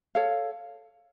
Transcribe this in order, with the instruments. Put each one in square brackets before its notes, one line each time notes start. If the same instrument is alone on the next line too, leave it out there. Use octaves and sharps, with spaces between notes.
[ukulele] A4 C#5 F5